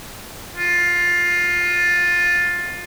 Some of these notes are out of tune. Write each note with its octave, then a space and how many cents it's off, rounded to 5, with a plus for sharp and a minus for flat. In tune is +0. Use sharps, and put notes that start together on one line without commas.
F4 +15